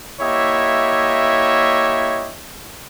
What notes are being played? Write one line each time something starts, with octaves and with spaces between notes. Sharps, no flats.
A#3 E4 G4 C#5 D#5 E5